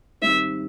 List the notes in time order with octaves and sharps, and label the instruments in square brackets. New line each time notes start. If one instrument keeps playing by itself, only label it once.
[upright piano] G#2 D#3 G3 C4 [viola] E5